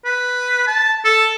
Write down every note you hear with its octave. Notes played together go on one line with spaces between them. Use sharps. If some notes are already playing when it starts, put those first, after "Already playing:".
B4
A5
A4